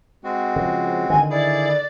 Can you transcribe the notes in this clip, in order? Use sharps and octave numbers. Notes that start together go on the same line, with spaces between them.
G#3 C4 F#4
C#3 F3
D3 D#3 G#5
E4 G#4 D5